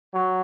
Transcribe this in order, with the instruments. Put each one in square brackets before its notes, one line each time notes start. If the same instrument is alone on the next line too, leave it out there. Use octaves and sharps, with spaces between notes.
[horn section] F#3